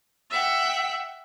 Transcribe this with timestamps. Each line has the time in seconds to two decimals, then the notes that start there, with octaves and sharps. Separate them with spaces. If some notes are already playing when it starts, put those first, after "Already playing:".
0.31 E5 F#5 G5